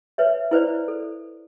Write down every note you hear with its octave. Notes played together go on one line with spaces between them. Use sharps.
B4 C#5 E5
E4 B4 C5 D5
A4